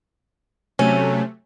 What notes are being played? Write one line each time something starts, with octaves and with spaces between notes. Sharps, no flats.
C3 F#3 A3 C#4